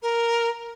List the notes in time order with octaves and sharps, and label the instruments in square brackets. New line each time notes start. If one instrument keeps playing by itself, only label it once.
[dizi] A#4